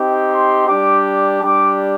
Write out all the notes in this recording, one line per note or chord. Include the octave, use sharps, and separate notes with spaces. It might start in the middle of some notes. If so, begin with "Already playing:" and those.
Already playing: C4 D#4 G4
C6
G3 D4 G4 D6
G3 D4 G4 D6